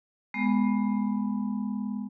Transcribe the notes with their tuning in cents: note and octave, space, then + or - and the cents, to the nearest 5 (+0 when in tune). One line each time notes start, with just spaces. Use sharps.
G#3 +0 B3 +0